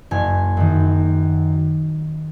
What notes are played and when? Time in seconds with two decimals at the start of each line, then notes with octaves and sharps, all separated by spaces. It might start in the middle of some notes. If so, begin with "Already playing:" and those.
0.11 F#1 G#5
0.57 F#2 D#3